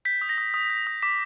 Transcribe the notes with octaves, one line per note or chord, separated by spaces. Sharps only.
G6 B6
D#6
A#6
D#6
D#6
G6
D#6
D6 B6